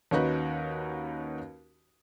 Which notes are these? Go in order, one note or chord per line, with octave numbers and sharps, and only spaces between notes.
D#2 C#4 D#4 F#4 B4